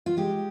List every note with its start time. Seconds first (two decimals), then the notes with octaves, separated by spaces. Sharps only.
0.06 F4
0.17 G#3 G4